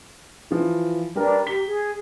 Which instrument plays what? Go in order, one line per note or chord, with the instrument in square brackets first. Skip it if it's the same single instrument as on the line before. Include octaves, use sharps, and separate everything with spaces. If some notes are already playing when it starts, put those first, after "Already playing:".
[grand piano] E3 F3
[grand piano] G3 A#4 [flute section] D4 B4 A#5
[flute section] G4 A#5 [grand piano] B6 G7
[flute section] G#4